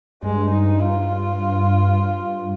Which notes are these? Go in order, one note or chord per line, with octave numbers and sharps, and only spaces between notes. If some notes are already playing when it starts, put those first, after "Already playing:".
G2 G#3
D#4
F4